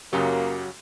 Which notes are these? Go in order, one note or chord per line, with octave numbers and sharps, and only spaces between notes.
F#2 C#3 F#3 A#3 G4